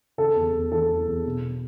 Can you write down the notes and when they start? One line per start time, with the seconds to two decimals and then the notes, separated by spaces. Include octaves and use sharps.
0.18 C#3 A4
0.36 E2
0.53 E2
0.71 E3 A4
0.90 E2
1.07 E2
1.26 B2